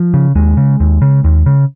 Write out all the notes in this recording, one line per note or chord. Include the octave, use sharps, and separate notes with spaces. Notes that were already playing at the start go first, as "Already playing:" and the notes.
Already playing: F3
C#3
D#2 G#3
C#3
D#2
C#3
D#2
C#3